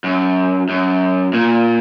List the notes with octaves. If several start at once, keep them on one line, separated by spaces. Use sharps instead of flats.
F#2
F#2
A#2